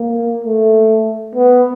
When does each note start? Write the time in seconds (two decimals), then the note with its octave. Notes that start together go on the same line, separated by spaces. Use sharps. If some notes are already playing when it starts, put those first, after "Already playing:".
Already playing: A#3
0.44 A3
1.35 B3